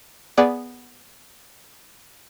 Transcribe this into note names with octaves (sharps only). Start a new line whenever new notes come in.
B3 G#4 D5